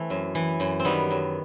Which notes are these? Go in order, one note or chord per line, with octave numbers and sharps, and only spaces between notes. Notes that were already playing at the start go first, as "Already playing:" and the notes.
Already playing: E3 A3 C4
F#2
E3
F#2
C4
D#3 G3 B3
F#2